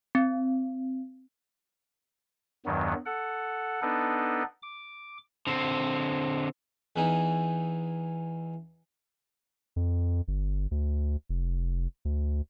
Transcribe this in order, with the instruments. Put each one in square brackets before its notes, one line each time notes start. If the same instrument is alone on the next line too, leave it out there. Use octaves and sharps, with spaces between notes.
[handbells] C4
[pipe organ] E2 G2 D#3 F#3 B3
A4 F#5
B3 D4 D#4 A4 B4
D6
[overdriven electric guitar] D3 C4
[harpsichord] E2 E3 D#4
[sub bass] F2
G1
D2
F1
D2